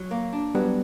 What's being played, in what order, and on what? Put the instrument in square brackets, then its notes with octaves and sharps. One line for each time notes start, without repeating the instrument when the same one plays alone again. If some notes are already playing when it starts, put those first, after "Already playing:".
Already playing: [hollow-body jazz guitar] F#3
A#3
D4
[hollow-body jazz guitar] F#3 [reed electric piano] G3 B3